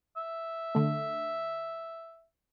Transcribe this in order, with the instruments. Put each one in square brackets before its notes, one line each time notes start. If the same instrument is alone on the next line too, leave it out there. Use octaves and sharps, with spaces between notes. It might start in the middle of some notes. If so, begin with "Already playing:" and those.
[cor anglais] E5
[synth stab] D3 A3